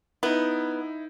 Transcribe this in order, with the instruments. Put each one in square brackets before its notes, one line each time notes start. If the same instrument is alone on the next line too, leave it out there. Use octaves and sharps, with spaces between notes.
[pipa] B3 [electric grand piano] D#4 E4